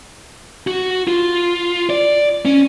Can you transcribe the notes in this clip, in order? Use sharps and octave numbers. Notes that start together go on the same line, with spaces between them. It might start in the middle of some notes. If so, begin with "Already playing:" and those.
F#4
F4
D5
C#4